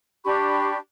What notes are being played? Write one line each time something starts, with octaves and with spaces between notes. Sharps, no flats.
D4 G4 B5 C#6